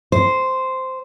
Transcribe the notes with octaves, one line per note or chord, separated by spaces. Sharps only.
C5